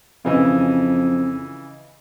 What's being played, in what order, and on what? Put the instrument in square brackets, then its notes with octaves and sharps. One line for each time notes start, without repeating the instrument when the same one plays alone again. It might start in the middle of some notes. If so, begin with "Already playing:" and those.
[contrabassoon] F2 [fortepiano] C#3 E3 D#5